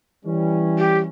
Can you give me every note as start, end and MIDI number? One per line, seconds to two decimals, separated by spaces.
0.25 1.09 52
0.25 1.09 55
0.25 1.09 61
0.78 0.98 67